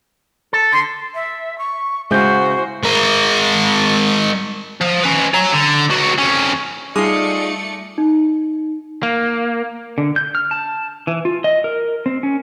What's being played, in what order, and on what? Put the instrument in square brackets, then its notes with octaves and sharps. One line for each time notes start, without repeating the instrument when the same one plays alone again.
[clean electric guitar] A4
[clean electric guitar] D3 [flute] C6
[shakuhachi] E5
C#6
[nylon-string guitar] C#3 E4 [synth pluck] G#3 G6 [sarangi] F#4 [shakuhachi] C5
[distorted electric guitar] G#3 A#4
F3
C#4 B4
C#5 A#5
D3
C#2 F#4
F2 C#4
[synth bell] G3 D6 [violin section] A3 D5 C#7 [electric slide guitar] D#4 F4 [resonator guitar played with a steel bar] G#4
[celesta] D#4
[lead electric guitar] A#3
[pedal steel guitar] D3
G6
F6
A5
E3
F4
D#5
A#4
C4
C#4